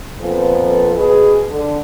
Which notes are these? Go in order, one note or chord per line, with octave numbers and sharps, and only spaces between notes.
F2 A#2 F3 B3 A4 B4
B2 G#4 B4
D3